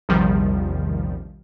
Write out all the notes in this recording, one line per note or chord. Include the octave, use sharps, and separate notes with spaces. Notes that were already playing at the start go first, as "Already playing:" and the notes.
A#1 E2 C3 D#3 F3 G3